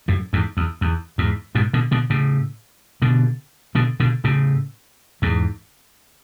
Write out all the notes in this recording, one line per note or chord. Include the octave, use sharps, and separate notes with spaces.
F#2 A2
E2 G#2
E2
E2
E2 G#2
G#2 B2
B2 D3
B2 D3
A2 C#3
B2 D3
B2 D3
B2 D3
A2 C#3
E2 G#2